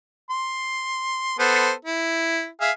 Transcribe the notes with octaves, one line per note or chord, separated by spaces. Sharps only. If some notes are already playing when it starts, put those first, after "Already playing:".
C6
B3 A4 C5
E4
G#4 E5 F5